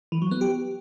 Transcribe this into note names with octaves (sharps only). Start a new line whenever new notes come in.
E3
F#3
B3
G4